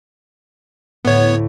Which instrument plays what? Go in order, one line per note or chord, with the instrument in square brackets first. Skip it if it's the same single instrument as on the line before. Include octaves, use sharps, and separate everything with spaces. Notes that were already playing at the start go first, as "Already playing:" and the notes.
[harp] D2 A2 [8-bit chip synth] B3 C#5